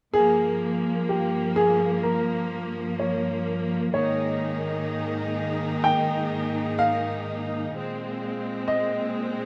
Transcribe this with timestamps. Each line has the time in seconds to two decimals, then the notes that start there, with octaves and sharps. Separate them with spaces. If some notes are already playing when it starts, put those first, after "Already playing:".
0.14 G2 F3 A#3 G#4
1.09 G4
1.56 G#4
2.03 A#4
2.99 C#5
3.93 G#2 D#3 A#3 D#4 G#4 C#5
5.84 G5
6.79 F5
7.73 A#2 G#3 C4
8.68 D#5